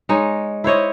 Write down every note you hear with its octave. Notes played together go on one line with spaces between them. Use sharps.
G#3 D#4 C#5
E4 C5 C#5 D#5